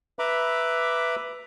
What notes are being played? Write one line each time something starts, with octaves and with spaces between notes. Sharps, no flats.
B4 E5 A#5 B5 D6